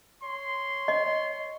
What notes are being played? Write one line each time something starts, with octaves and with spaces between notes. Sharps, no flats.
C#5 C6
D#5